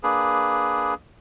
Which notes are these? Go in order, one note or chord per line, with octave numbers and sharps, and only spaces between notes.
A#3 D4 G#4 B4